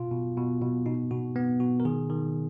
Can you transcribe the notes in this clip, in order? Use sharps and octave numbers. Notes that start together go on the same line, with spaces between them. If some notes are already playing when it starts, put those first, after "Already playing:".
Already playing: B2 F4
B2
B2
B2
B2 D#4
B2 F#4
B3
B2 F#4
A#4
D#3 G#4
D#3